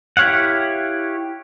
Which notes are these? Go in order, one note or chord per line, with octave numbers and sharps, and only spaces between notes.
E4 G4 C#5 F5 F#5